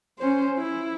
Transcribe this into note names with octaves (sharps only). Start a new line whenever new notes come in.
C#4 C5
E4